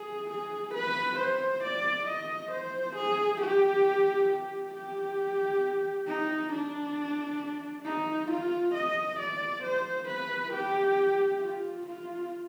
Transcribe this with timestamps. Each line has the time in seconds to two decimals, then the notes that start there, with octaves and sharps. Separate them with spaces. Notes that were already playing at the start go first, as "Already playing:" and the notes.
Already playing: G#4
0.30 G#4
0.74 B4
1.19 C5
1.64 D5
2.08 D#5
2.52 C5
2.96 G#4
3.41 G4
4.29 G4
4.74 G4
6.08 D#4
6.52 D4
7.85 D#4
8.31 F4
8.74 D#5
9.20 D5
9.63 C5
10.08 B4
10.53 G4
11.41 F4
11.87 F4